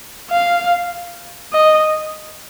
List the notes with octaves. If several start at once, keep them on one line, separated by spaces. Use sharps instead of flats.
F5
D#5